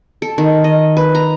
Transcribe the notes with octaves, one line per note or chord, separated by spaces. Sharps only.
A4
D#3
D#5
B4
A#5